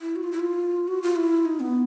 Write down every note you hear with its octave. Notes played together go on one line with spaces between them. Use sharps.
E4
F#4
F4
E4
F4
F#4
F4
E4
D#4
B3